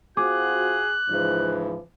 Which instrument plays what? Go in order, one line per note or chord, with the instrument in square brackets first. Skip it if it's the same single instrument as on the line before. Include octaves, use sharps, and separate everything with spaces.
[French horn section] C4 F4 F#4 [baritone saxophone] G#4 [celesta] D6 [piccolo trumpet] F#6
[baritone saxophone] G#2 [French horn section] C#3 E3 F3